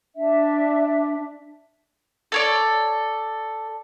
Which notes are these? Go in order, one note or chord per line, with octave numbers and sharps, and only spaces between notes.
D4 E5
A4 C#5 D5